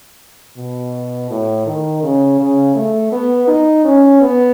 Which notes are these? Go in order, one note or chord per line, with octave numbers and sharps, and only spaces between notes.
B2
A2
D#3
C#3
C#3
A3
B3
D#4
C#4
B3